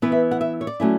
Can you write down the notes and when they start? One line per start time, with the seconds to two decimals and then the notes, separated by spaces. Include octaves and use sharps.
0.02 E3 B3 E4 B4
0.12 E5
0.31 F#5
0.41 E5
0.61 C#5
0.67 D5
0.80 F#3 A3 C#4 E4